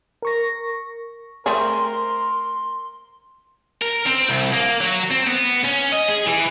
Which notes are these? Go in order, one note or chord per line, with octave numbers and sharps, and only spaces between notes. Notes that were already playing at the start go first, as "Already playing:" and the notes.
A#4 C#6 A#6
A3 C4 G#4 A#4 C6
A#4
C4
C2
A#3
F#3
C4
B3
C#4
D#5
G#4
E3